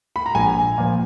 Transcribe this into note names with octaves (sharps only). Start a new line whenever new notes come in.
B5
A#5
A#1 G#5
A#2 F3